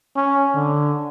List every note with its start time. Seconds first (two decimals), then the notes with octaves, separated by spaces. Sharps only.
0.16 C#4
0.55 D3